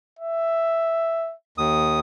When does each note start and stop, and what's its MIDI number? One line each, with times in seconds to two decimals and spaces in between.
0.19 1.34 76
1.58 2.00 39
1.58 2.00 87